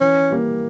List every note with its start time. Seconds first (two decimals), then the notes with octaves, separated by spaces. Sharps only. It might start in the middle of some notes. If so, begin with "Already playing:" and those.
0.01 E3 C#4
0.31 G3 A#3